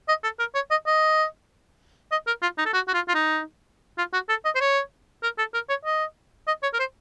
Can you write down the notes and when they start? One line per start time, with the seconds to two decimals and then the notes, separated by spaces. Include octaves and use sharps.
0.08 D#5
0.23 A4
0.39 A#4
0.55 C#5
0.71 D#5
0.86 D#5
2.12 D#5
2.27 A#4
2.42 F4
2.58 D#4
2.66 A4
2.73 F#4
2.88 F#4
2.94 F4
3.08 F4
3.15 D#4
3.98 F4
4.13 F#4
4.29 A4
4.45 D#5
4.55 C5
4.60 C#5
5.23 A#4
5.38 A4
5.54 A#4
5.69 C#5
5.85 D#5
6.47 D#5
6.63 C#5
6.74 A#4
6.79 C5